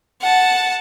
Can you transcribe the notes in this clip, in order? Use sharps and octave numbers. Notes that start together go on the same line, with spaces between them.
F#5 A5